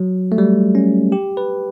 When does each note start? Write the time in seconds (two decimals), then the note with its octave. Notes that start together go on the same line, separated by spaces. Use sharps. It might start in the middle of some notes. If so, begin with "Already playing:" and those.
Already playing: F#3
0.32 A3
0.38 G3
0.75 C#4
1.12 G4
1.37 B4